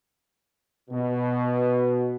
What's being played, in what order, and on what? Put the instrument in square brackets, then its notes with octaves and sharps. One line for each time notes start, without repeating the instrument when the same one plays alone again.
[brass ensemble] B2